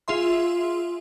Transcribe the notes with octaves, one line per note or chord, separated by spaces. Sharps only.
F4 G#4 E5 C6